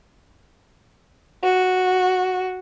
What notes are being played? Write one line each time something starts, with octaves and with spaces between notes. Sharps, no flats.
F#4